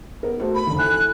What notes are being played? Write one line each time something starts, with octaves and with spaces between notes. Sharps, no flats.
B3 A#4
A3 F#4 C5
B5
F1 D3
E4 A4 G#5 F#6